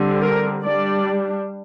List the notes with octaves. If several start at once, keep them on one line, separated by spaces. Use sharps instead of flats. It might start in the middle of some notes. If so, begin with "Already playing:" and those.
Already playing: D3 G3 C4
A#4
G3 D4 D5